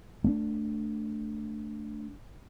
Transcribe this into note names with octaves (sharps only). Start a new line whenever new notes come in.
A3 A#3 D4